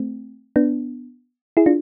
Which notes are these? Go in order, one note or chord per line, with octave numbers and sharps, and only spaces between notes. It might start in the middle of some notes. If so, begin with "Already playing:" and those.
Already playing: A3 C4
B3 D4
E4 G#4
D4 F4